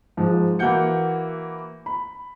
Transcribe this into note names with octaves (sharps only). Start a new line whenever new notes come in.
G#2 F3
E3 A#3 F#4 F#5 G6 C#7
B5